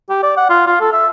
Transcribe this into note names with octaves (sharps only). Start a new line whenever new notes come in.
G4
D5
F#5
F4
F4
A4
E5